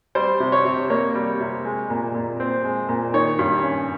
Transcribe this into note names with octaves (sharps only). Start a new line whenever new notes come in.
G3 C5
C3
C#5
C3
A#3 C#5
G3
C3
G#3
A#2
A#2
C4
G#3
A#2
D#3 C#5
G2
C#4